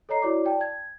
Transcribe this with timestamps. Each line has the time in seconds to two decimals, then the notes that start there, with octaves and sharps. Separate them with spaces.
0.09 A4 C#5 D#5 A#5 C7
0.22 E4 F#4 C#5 D5 D6
0.44 D5 G5 A5
0.61 G#6